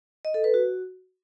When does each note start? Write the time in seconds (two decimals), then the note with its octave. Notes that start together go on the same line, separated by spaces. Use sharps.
0.25 D#5
0.34 A4
0.44 B4
0.54 F#4